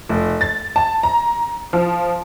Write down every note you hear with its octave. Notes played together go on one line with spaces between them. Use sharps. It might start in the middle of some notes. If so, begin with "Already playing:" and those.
F1
A6
A5
A#5
F3